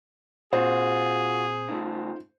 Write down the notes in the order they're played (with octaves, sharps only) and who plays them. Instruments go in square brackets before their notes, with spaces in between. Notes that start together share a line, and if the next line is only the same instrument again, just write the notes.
[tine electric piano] A#2 C4 [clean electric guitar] F4 F#4 [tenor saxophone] G#4 [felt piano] C5
[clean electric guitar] C#3 A3 [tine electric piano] D#4 F4